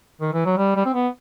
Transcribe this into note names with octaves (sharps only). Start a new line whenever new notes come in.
D#3
E3
F#3
G3
G3
C4
B3